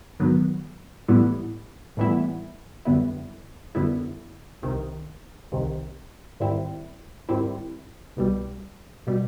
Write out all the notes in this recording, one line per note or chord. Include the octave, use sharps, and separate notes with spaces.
G#2 D#3 F#3 B3
A2 E3 G3 B3 E4
A2 E3 G3 B3 E4
F#2 D3 G3 B3 E4
F#2 D3 G3 B3 E4
C2 C3 D#3
C2 C3 D#3
G#2 D#3 G3 C4 E4
G#2 D#3 G3 C4 E4
C2 B2 G3
B2 G3